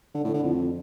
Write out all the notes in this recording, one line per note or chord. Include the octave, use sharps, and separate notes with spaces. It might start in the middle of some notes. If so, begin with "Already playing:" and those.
D3
A2
D3
F2